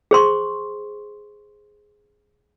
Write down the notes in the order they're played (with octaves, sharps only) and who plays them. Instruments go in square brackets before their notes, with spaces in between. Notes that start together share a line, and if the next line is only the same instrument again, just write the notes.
[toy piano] G#4 C5 C6 C#6